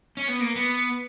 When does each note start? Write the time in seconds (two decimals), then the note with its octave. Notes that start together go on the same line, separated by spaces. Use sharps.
0.17 C#4
0.28 B3
0.41 A#3
0.56 B3